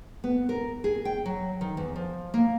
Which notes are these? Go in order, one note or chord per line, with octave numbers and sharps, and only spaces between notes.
B3
A#4
G#4
G5
F#3
D#3
E2
F3
A#3